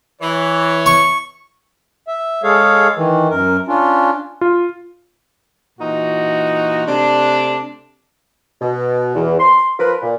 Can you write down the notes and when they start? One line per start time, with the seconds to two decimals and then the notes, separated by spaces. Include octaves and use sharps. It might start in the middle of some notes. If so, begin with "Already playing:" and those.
0.22 E3 C#5
0.86 C#6
2.08 E5
2.44 G#3 G#4 A4 C#5 F5
2.96 D#3 E3
3.30 F#2 A#4
3.68 C#4 D4 F4
4.41 F4
5.80 A#2 E3 D#4 F#4
6.87 C3 A3 D4
8.62 B2
9.15 E2
9.39 C6
9.79 F3 F4 A#4 B4
10.02 A#2